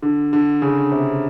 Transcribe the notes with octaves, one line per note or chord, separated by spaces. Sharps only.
D3
D3
C#3
C3